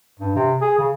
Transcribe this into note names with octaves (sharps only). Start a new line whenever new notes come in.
G2
C3
G#4
C#3